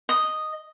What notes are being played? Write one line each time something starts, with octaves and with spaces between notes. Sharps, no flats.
D#5